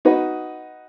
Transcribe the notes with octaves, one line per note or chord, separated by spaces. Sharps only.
D#4 F#4 B4 D#5